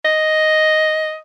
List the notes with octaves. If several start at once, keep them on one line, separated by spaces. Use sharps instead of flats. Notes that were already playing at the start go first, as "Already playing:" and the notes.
D#5